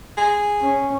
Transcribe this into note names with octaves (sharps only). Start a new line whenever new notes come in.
G#4
C#4